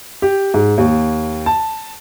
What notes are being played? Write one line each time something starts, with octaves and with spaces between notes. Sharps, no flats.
G4
G#2
D#2
A5